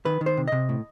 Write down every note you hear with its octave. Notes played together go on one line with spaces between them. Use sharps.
D#3 B4
D#3
C5
C3
C3 D#5
A2